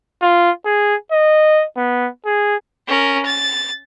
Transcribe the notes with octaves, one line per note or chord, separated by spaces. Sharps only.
F4
G#4
D#5
B3
G#4
C#4 A#4
A6